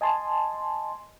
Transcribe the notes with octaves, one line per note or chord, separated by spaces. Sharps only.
D#5 G#5 A5 C6